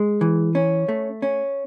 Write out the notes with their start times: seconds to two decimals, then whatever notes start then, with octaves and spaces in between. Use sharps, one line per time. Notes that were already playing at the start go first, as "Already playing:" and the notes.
Already playing: G#3
0.21 E3
0.55 C#4
0.88 A3
1.22 C#4